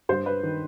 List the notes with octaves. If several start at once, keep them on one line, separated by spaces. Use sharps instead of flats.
G2 C5
B4
D#3